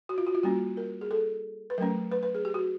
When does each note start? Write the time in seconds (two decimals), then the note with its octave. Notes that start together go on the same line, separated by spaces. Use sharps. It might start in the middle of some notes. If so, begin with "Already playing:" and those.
0.09 F#4
0.18 F4
0.27 F#4
0.35 F4
0.43 G3 A#3 C#4 F#4
0.77 A#4
1.01 G#4
1.11 A4
1.70 B4
1.78 F#3 A3 C#4 A#4
2.12 B4
2.23 B4
2.35 G#4
2.45 G4
2.54 F#4